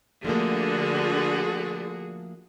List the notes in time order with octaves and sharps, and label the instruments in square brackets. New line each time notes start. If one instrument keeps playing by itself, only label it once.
[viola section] D3 [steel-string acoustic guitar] F3 A3 A#3 [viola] F#4 G#4